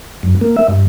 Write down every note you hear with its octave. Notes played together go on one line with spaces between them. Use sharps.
F#2
A#3
E5
G2